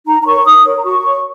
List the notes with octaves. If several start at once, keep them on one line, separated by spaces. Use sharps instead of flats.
D#4 A#5
A#5
A#4 C#5 C#6
D#4 D#6
A#4 C#5
A#5
F#4 C#6
A#4 C#5